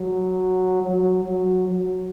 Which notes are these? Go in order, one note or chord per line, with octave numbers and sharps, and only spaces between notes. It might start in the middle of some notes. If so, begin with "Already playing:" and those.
Already playing: F#3
F#3
F#3
F#3